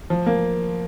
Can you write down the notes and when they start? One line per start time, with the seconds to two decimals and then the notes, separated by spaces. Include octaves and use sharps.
0.10 F3
0.26 A#3